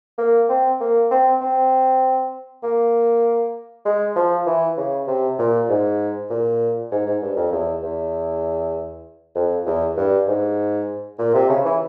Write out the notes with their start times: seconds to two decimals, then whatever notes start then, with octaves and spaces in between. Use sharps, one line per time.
0.19 A#3
0.49 C4
0.80 A#3
1.11 C4
1.42 C4
2.64 A#3
3.85 G#3
4.16 F3
4.47 E3
4.78 C#3
5.08 C3
5.39 A#2
5.69 G#2
6.30 A#2
6.92 G#2
7.06 G#2
7.22 G2
7.37 F2
7.53 E2
7.83 E2
9.36 F2
9.67 E2
9.97 G2
10.28 G#2
11.19 A#2
11.34 C3
11.50 C#3
11.65 E3